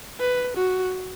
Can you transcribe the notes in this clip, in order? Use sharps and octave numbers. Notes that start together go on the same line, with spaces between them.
B4
F#4